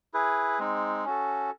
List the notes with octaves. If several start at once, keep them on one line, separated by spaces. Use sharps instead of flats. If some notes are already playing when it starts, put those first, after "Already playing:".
E4 G#4 B4
G#3 C4 D#4
C#4 F#4 A4